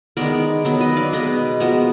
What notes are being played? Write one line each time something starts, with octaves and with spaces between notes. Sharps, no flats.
D#3 G#3 B3 A#4 D5
D#3 F#3 B3
B4 D#5
D5 F5
B2 G#3 B3 B4 D#5
F3 G#3 B3 F#4 A#4